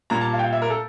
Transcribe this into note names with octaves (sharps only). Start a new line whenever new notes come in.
A#2 G3 A#3 A#5
A5
F5
G5
F5
E5
A#4
A4